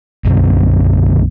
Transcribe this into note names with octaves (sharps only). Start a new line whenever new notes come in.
B1 F#2 B2 D3